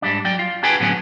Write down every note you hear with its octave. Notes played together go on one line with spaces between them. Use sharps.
G#2 G3 D4
F#3 D5 G5
F4
D4 F#4 G#4 B4 G5 G#5
A2 D3 F#3 B3 C#4